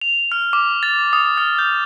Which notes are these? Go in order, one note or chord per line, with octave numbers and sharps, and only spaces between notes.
F7
F6
D6
A6
D#6
F6
G6